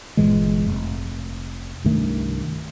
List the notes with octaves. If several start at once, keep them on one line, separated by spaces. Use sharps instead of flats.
G1 A#2 E3 G#3
F1
C2 G2 D#3 A3